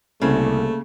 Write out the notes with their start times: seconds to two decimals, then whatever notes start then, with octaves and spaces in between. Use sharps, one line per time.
0.22 C2 C#3 A3 A#3